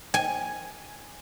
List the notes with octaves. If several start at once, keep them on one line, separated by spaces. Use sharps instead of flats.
G#5